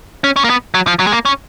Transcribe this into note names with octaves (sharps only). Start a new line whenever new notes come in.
C#4
C#4
A#3
B3
F#3
F3
F#3
G#3
A#3
C#4